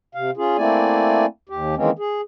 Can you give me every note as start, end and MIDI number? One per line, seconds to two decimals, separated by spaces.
0.15 0.31 48
0.15 0.31 77
0.37 0.57 61
0.37 0.57 65
0.37 0.57 68
0.57 1.26 57
0.57 1.26 58
0.57 1.26 60
0.57 1.26 64
0.57 1.26 74
0.57 1.26 80
1.49 1.75 39
1.49 1.75 67
1.76 1.90 51
1.76 1.90 52
1.76 1.90 56
1.76 1.90 58
1.76 1.90 60
1.76 1.90 61
1.99 2.21 68